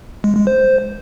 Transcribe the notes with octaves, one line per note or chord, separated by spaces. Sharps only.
G#3
G#3
C5